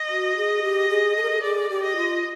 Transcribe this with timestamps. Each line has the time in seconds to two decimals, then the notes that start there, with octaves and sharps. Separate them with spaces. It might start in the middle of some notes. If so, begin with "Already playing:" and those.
Already playing: D#5
0.09 F#4
0.37 G#4
0.63 G4
0.90 G#4
1.17 A4
1.23 A#4
1.30 A4
1.42 G#4 D5
1.70 G4
1.83 D#5
1.96 F4